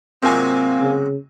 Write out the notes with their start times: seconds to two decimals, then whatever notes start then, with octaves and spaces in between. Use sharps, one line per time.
0.23 G#2 C3 F#3 A#3 C4 F4 G#5
0.80 C#3